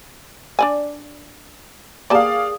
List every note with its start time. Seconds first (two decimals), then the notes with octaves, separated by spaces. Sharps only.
0.59 D4 D5 G#5
2.10 A#3 G4 G#4 D5 F5 A5